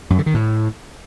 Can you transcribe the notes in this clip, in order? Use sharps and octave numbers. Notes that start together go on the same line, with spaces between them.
F#2
D3
D#3
A2